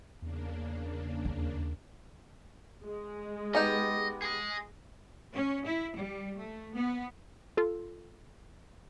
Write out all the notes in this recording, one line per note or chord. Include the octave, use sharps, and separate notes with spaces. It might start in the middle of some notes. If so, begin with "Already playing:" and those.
E2 C#3 A#3 D4
D#2
G#3
B3 D#4 G4 D#5
G#4 D#5
C#4
E4
G3
A3
B3
F4 A4